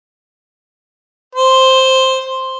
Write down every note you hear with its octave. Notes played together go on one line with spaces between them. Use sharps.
C5